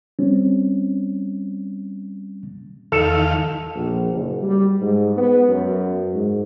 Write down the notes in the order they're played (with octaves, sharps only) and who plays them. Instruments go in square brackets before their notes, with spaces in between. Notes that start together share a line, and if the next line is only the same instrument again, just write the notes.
[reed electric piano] G3 C4 C#4
[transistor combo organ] E2 D#3 F5 [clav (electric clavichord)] A4
[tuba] A#1
F#1
G3
G#2
B3
F#2
G#2